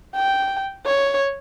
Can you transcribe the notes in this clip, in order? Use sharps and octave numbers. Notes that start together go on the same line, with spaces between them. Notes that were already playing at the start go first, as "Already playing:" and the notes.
G5
C#5